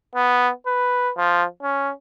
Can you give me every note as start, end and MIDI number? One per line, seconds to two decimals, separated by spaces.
0.15 0.50 59
0.66 1.11 71
1.17 1.44 53
1.62 1.91 61